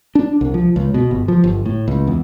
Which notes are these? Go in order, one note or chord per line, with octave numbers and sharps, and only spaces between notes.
D4
C2
F3
C#2
B2
G1
F3
G1
A2
C#2
E2